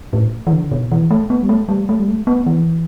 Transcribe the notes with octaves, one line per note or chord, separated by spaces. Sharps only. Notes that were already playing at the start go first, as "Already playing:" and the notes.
A2
E3
D3
B2
E3
A3
B3
G3
A3
G3
A3
G3
A3
B3
E3